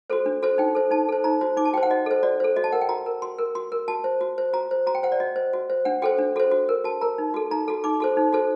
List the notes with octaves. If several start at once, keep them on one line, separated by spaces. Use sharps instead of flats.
F#4 A4 C5
D4
F#4 A4 C5
D#4 G5
A4 C5
D#4 A5
A4 C5
D#4 A#5
F#4 C5
D#4 D6
A5
F#4 C5 G5
F#5
F#4 D#5
A4 C5
F#4 D5
A4 C5
F#4 D#5
A5
A#4 F#5
G5
F#4 A#5
A#4
F#4 C6
A#4
F#4 C6
A#4
F#4 A5
C5
F#4
C5
F#4 A#5
C5
F#4 A#5
G5
C5 F#5
D5
F#4 D#5
C5
F#4
C5
D4 F#5
F#4 A4 C5 G5
D4
F#4 A4 C5
F#4
A#4
F#4 A5
A#4 A#5
D#4
F#4 A4
D#4 A#5
F#4 A4
D#4 D6
F#4 A4 C5
D#4
F#4 A4 C5